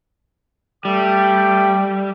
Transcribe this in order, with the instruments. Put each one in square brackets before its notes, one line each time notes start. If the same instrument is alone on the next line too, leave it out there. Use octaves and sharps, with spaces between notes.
[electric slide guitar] G3 [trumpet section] A3 G5 D6